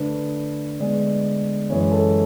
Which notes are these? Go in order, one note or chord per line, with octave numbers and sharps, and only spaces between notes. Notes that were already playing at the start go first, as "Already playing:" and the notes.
Already playing: D3 A3 D4 B4
D3 G#3 B3 D5
F#2 E3 G#3 C#5
A4